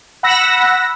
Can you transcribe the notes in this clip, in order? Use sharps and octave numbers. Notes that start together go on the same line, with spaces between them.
F#5 B5 E6 A#6